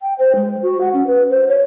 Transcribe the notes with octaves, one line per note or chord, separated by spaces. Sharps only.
G5
C5
G#3
F#4
F#5
C#4
B4
C5
C#5